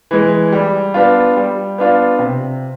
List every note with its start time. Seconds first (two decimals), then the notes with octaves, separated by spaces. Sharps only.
0.11 E3 G#3
0.52 G3
0.94 B3 D4 F4
1.37 G3
1.78 B3 D4 F4
2.19 C3